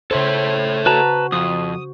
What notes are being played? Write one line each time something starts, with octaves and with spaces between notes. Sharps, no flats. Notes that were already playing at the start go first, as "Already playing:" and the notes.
C#3 A4 C5 C#5 E5
F#4 B4 A5 A#5
F2 D#6